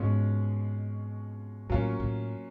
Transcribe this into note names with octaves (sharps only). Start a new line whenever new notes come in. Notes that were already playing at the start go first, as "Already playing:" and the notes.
Already playing: G#2 B2 G#3 C#4 F4
A2 F#3 A#3 C#4 F4
A2